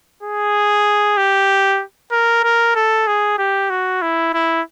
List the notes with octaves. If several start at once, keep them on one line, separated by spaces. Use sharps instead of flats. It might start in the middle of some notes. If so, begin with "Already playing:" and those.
G#4
G4
A#4
A#4
A4
G#4
G4
F#4
E4
E4